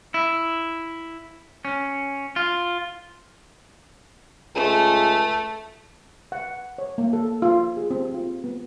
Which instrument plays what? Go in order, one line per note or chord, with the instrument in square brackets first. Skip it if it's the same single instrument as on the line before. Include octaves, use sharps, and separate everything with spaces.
[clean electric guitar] E4
C#4
F4
[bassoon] C#2 [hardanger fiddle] A3
[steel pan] F#5
C#5
A#3
A4
F4
G#4
C4
F4
B3